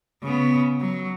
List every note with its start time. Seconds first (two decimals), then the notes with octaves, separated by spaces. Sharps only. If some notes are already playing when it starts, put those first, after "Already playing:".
0.23 C#3 B3
0.81 F#3